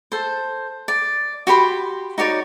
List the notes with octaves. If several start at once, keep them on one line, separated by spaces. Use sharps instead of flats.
A4 C5
D5
F#4 G4 B5 C6
D#4 F#4 C#5 D5